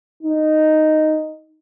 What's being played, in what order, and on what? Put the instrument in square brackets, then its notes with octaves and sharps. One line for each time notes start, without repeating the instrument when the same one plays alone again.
[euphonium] D#4